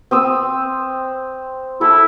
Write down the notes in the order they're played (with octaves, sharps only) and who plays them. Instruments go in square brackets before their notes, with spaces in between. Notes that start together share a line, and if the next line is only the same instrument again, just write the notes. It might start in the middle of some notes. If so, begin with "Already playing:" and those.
[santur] C4 D#6 E6
[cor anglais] E4 [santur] A4